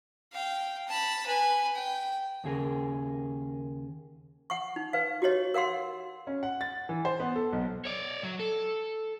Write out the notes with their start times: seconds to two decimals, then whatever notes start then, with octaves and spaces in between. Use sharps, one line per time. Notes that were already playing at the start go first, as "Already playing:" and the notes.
0.32 F5 G5
0.88 A5 B5
1.26 B4 G#5
1.75 G5
2.44 D#2 C#3 G#4 A#4
4.50 F#5 C#6
4.76 D#4
4.93 B4 F5
5.22 F#4 G4 C#5 D#5
5.54 A#4 F5 F#5 C6
6.27 C#4
6.43 F#5
6.61 A6
6.89 E3
7.05 C5
7.20 B3
7.36 A4
7.53 B1
7.85 C#5 D5
8.24 F#3
8.40 A4